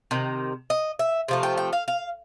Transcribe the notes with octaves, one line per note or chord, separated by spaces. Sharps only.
C3 D#3
D#5
E5
C3 F3 A3
G5
G5
F5
F5